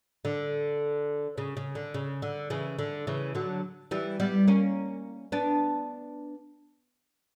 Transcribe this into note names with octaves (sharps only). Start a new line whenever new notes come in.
D3
C#3
C#3
D3
C#3
D3
C#3 E3
D3
C#3 E3
D3 F#3
E3 G3
G3 B3
A#3 C#4
B3 D4